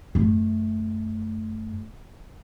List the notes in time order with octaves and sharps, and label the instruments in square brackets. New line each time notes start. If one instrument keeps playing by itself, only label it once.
[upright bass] F#2 A3